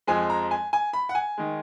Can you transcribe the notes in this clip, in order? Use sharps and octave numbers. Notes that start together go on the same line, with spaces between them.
F2 F3 G#3 G#5
A#5
G#5
G#5
B5
F#5
G#5
D#3 G#3